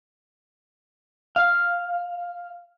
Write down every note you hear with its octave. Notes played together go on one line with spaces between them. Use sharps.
F5